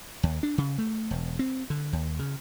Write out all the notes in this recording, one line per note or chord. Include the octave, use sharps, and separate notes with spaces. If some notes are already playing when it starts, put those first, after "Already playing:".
D#2
D4
C#3
A3
E1
C4
D3
D#2
C#3